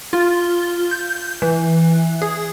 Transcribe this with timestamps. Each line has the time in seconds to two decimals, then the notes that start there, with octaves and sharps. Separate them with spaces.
0.13 F4
0.91 G6
1.42 E3
2.22 G#4